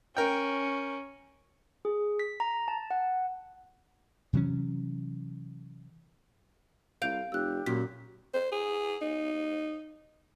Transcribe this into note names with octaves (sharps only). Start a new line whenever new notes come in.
C#4 A#4 G5
G#4
B6
A#5
A5
F#5
C3 E3 F#3 C#4
C2 F5 G6 D7
F1 G4 E6 F#6
F#2 A#2 B6
C5
G#4
D#4